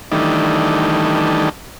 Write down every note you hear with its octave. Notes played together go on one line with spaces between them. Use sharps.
D#3 E3 G3 A3 D4 D#4